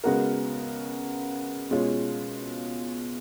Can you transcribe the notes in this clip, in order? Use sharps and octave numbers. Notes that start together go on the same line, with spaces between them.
C#3 G#3 B3 F#4 A#4
B2 G#3 C#4 F4